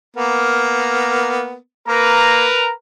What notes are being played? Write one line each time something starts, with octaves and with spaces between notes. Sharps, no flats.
A#3 B3 A#4
A#3 A#4 B4 A#5